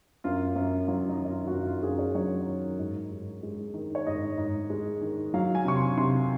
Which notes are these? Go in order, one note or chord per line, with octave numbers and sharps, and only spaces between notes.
F#2 F4
F#2
F#3 F4
D#4
D#3 D#4
F4
F#4
F#2 F4
F4
F#2 G#4
C#5
F#3 C#5
D#3
G#2
G#2
G#3
D#3
C#5
G#2 D#5
G#2
G#3
D#3
F#3 F5
G#5
C3 C#6
C6
C3 C6